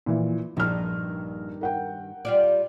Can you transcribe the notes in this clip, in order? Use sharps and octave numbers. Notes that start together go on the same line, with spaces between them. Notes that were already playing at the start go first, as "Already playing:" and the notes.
A#2 E3 F3
A#1 G2 D#3 F6
A#4 F#5 G5
G3 F4 D5